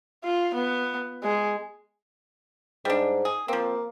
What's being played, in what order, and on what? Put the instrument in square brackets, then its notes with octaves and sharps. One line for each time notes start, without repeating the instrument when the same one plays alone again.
[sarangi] F4
B3
G#3
[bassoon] G#2 [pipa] G3 D4
[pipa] G#4
[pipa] F3 C4 [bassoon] A#3